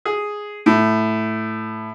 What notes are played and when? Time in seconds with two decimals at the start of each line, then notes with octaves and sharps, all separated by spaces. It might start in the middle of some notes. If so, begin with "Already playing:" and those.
0.05 G#4
0.66 A2